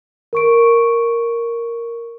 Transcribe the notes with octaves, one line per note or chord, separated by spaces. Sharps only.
A#4 C#6 D7